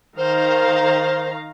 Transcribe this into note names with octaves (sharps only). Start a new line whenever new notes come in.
D#3 C5 F5 A#5